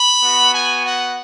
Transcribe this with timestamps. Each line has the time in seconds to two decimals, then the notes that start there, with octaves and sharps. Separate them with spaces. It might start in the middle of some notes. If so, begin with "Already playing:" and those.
Already playing: B5
0.23 B3 F#4
0.54 G#5
0.84 F#5